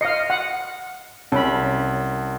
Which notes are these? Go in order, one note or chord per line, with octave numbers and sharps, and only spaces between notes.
D#5 F5 C7 C#7
F#5
C2 C#4 A5 B5